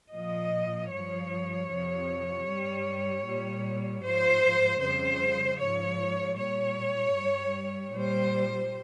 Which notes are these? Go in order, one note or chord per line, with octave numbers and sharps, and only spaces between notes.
A#2 F3 D#5
G2 F3 C#5
F2 C3 F3
G2 G3
A#2 G3
G#2 F3 C5
F2 C#3 G3 C5
G#2 F3 C#5
A#2 G3 C#5
G2 G3
A#2 G3 C5